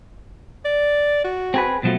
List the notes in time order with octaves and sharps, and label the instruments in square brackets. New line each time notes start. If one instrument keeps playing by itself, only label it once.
[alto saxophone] D5
F#4
[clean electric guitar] C4 G#4 B4
[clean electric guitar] B2 F#3 A3 [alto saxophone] F3